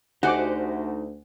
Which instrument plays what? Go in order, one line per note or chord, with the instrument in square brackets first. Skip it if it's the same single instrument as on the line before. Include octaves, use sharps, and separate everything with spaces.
[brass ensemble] D2 [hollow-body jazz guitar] D#4 [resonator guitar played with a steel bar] F#4 G4 C5 [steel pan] F#5 G#5 D6